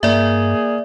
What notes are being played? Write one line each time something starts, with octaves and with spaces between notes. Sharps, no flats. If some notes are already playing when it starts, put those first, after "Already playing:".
G2 A#3 G#4 D5 E5